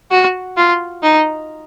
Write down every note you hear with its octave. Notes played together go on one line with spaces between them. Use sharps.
F#4
F4
D#4